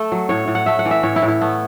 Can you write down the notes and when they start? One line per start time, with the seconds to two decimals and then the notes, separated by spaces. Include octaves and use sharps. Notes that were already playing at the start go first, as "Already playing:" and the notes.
Already playing: A3 A4
0.12 F#3
0.29 A2 C#5
0.48 A2
0.55 F#5
0.66 A3 E5
0.79 F#5
0.85 E3
0.91 E5
1.03 A2 C#5
1.16 E4
1.22 A2
1.28 E4
1.41 A3 B3